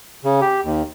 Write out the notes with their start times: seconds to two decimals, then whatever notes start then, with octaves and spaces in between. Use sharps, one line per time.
0.25 C#3
0.41 G4
0.64 D#2